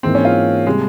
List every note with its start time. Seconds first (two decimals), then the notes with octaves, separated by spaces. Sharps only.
0.03 G#2 E3 A#3 C4
0.15 C#4
0.25 F4
0.67 C3 G3 G#3